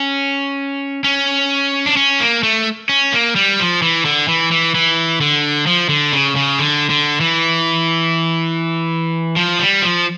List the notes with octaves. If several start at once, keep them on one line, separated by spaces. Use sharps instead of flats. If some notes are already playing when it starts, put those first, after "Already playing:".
Already playing: C#4
C#4
D4
C#4
A#3
A3
C#4
A#3
G3
F3
E3
D3
E3
E3
E3
D3
F3
D3
C#3
C#3
D3
D3
E3
F3
G3
F3